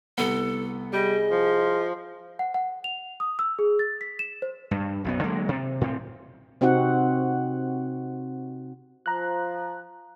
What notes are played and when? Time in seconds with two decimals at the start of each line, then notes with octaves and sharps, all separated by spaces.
0.18 C2 B3 A4
0.93 G3 G#4 D#5
1.31 F3
2.39 F#5
2.54 F#5
2.84 F7
3.20 D#6
3.39 E6
3.59 G#4
3.79 A6
4.01 B6
4.19 E7
4.42 C5
4.71 G2
5.04 B1 F#2 B3
5.24 D3 F#3 G#3 A#3
5.49 C3
5.81 A2 C4
6.61 C3 C4 D#4 F#4 F#5
9.06 F3 A#5 F#6